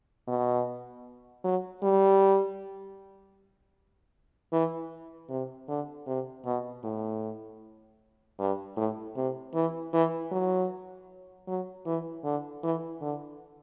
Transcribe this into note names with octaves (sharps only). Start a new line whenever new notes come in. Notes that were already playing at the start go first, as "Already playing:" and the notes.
B2
F#3
G3
E3
C3
D3
C3
B2
A2
G2
A2
C3
E3
E3
F#3
F#3
E3
D3
E3
D3